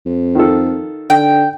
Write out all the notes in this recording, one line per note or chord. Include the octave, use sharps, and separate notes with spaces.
F2
D#3 F4 A4
D3 G5